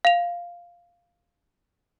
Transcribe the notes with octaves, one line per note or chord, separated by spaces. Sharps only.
F5 F7